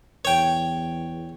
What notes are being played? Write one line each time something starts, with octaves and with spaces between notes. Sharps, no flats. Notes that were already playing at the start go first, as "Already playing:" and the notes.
E2 C#5 G5